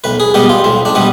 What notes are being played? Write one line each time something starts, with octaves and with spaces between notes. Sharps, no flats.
B1 B4
G#4
B2 G3 B3 G4
F4
B1 C4
D4
B2 G3 B3